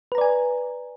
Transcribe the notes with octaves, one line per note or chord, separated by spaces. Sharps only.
B4 D5 G#5 A#5